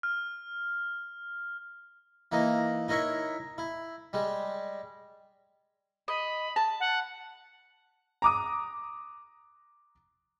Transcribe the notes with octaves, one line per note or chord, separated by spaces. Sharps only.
F6
E3 A#3 D#4
D#4 E4 A#4 C#5 E5
E4
G3 G#3
D#5 B5
A5
F#5
A#5 D6 D#6